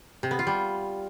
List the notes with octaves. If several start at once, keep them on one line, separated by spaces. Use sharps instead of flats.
C3
B3
F4
G3